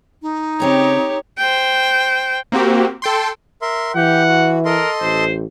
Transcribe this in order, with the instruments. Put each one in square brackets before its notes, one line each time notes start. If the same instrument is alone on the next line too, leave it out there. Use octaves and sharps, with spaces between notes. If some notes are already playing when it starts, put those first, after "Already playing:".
[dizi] D#4
[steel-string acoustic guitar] C#3 C4 A#5 [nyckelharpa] G4 C#5
[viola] C5 G5
[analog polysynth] A#3 C4 F#4 G4
A4 G5 C6
[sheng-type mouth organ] A#4 E5 C6
[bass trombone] E3 [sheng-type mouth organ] G4 [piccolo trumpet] F#5
[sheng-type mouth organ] F#4
[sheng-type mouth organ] A4 D#5 C6 [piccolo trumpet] A#4
[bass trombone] A1 [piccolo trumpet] C5